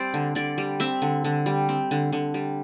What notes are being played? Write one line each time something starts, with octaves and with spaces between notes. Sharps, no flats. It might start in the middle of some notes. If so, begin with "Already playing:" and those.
Already playing: G3 C4 C5 D5
D3
D3 D5
G3
C4 E5
D3
D3
G3
C4
D3
D3
G3